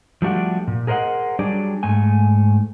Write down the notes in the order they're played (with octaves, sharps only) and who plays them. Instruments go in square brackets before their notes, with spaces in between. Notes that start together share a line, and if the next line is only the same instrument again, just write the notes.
[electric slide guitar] F3 G3 A3 D4 F#4 G4
A#2
G#4 A#4 C5 D#5 F#5
F#3 G3 D4 G4 G#4 D5
G#2 A3 G#5